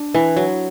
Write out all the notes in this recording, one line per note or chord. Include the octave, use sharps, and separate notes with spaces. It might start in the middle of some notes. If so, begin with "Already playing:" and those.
Already playing: D4
E3
F#3